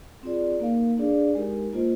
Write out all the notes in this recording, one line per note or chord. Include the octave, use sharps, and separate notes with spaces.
C4 F4 G#4 D5
A#3 D#4 A#4 F5
D4 G#4 D5 F5
G#3 D#4 G4 A#4
A#3 F4 C5 D#5